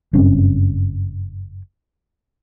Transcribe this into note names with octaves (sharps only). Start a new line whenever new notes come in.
F#1 G2 C4 C#4